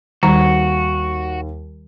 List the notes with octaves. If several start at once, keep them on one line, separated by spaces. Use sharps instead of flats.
D#2 D#3 G3 F#4 A#5